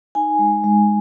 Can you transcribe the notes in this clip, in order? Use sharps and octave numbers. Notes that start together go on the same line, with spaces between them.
D#4 G#5
G#3
G#3